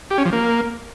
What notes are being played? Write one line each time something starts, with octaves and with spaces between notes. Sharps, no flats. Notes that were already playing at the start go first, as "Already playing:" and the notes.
G4
C#4
F3
A#3